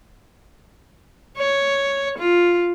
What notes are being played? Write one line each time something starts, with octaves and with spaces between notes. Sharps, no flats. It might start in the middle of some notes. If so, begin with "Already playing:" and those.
C#5
F4